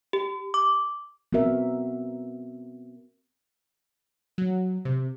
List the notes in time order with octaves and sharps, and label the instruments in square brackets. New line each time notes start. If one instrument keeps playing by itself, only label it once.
[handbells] G4
D6
[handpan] B3 C4 F#4 A#4 E5
[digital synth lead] F#3
C3